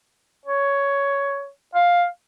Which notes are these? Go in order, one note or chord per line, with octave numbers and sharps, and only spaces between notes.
C#5
F5